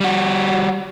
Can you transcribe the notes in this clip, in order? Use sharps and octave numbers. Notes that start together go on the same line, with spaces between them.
G3 F#4